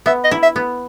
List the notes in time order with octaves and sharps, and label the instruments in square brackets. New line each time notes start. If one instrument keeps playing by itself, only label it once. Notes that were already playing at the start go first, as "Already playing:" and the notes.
[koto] B3 [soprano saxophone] E5
[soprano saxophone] D#5
[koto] E4
[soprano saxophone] E5
[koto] B3